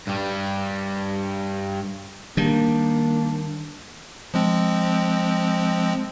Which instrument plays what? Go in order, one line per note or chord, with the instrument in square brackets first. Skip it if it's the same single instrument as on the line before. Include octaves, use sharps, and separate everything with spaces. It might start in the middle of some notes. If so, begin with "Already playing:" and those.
[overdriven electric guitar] G2 G3
[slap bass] D#3 G3 [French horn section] A#3 [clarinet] D4
[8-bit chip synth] F3 G#3 C4